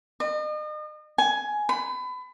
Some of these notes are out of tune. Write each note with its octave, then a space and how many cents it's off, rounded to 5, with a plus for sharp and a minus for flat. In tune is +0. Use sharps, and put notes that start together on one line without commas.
D#5 -40
G#5 +15
B5 +30